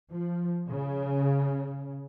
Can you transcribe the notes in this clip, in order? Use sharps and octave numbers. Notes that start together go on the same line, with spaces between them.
F3
C#3